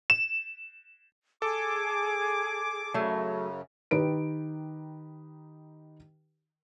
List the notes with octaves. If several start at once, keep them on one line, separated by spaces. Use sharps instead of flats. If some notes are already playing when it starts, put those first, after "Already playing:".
E7
G#4 A4 D6
F#2 C#3 F#3 A3
D#3 D#4 G4 B4 D7